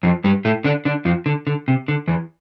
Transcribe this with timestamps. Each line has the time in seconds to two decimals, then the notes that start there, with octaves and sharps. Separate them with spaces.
0.03 F2 F3
0.24 G2 G3
0.45 A2 A3
0.64 D3 D4
0.85 D3 D4
1.05 F2 F3
1.26 D3
1.47 D3
1.68 C3
1.88 D3
2.08 E2 E3